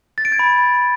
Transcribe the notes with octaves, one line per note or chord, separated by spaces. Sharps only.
A6
D7
G#6
B5